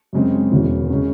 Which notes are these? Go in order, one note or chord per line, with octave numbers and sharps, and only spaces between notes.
F#2 C#3 G#3 C4
E1 E2 C#3 E3
C#3 G#3 C#4